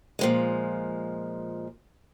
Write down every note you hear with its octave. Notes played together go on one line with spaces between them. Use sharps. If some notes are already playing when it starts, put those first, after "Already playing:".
A#2 F3 G#3